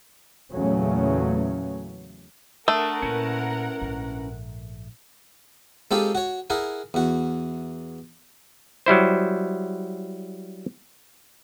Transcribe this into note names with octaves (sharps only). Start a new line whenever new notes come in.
E2 A#2 C#3 F#3 A3 C#4
A3 D4 A#4 F#5 D#6
A#2 C#4 E4 B4
A#1 G#2
G#3 C4 D#4 F4 G4 A4
F#4 C#5
E4 G#4 A#4 F#5
E2 F#4
F#3 G3 E4 C5